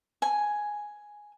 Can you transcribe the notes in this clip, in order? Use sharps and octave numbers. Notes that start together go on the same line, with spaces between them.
G#5